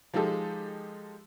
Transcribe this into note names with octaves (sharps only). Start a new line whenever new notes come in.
F3 G#3 D#4 G4 A4